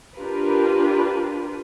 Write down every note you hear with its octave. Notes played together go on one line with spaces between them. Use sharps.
D4 F4 G4 A#4 B4